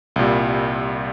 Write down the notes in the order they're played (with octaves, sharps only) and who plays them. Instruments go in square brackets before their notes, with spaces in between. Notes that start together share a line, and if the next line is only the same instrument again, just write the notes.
[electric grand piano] C2 A#2 G3